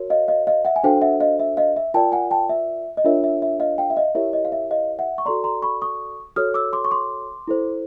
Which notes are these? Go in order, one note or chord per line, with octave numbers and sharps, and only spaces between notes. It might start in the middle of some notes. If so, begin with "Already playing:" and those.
Already playing: F#4 A#4 C#5
D#5 F5
D#5 F5
D#5 F5
E5 F#5
G#5
D4 F#4 A4 C5 F5 G5
E5 F#5
D#5 F5
E5
D#5 F5
E5
F4 A#4 D5 G5 A5
F#5 G#5
G5 A5
E5
D#5
D4 F4 A#4 C#5 E5
E5
E5
D#5 F5
F5 G5
E5
D#5 F5
E4 G4 A#4 C#5 E5
D#5
F5
E5
D#5 F5
E5 F#5
C#6
F#4 A4 D5 A#5 C6
A#5 C6
B5 C#6
C#6 D#6
F#4 A4 C#5 D#6 F6
D6 E6
C6 D6
C#6
C6 D6
E4 A4 C5